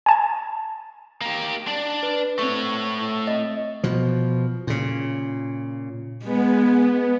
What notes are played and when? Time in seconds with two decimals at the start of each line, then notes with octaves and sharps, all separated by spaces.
0.06 G#5 A5 G#6
1.21 A#3 G4
1.68 D4 D5
2.03 B4
2.39 A3 C4 C#5 C#6
3.27 D#5
3.84 B2 F3
4.67 A#2 C#3
6.24 G#3 B3